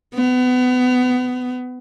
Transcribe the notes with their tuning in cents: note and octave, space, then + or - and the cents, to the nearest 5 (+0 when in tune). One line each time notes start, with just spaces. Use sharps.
B3 +25